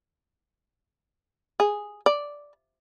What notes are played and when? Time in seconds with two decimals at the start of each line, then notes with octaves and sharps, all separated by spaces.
1.60 G#4
2.06 D5